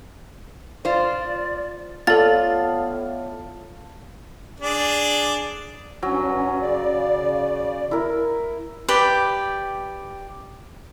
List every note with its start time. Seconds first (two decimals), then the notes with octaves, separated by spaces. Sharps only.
0.85 F4 C5 D5
2.07 A2 B3 F4 A4 D5 F5 A5 A6
4.60 D4 G#4 D5
6.03 G2 F#3 C#4
6.62 C#3 D5
7.91 E4 A#4
8.89 G4 B4 D5 G5